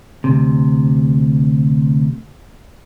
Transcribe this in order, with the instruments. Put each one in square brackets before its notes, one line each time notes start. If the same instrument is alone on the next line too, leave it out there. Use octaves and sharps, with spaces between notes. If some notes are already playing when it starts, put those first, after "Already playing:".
[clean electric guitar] D2 C3